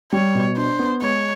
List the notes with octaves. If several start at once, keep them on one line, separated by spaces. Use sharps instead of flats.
G3 C#5
B2
D4 C5
B3
G#3 C#5